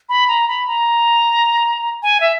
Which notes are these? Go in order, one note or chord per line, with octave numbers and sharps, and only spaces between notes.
B5
A#5
B5
A#5
G#5
E5